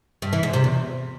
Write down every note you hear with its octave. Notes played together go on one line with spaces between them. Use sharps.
G2
E3
G#2
C3
E2